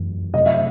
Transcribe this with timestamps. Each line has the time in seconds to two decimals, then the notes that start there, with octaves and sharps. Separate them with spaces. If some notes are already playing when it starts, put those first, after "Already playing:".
Already playing: F#2 E3 A3
0.34 C3 F#3 A3 D#5
0.46 E5